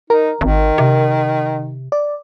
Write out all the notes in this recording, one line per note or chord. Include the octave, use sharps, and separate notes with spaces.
D#4 A#4
G#1 D#3
C3
D5